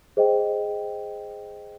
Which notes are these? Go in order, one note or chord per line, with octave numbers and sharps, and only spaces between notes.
G#4 C5 D#5 G5